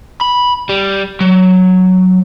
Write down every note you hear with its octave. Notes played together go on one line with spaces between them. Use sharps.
B5
G3
F#3